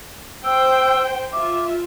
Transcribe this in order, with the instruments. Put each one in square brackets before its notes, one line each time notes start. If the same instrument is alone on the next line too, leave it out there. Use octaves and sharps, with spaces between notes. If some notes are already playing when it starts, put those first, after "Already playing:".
[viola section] C5 G5 [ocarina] E6
[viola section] F4 E5 [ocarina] D6